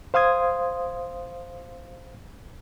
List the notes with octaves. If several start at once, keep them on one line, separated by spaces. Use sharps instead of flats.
C5 F5 C6 D#6 G#6